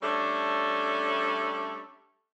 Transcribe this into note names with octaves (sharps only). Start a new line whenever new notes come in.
G3 A3 C#4 D4 A4 E5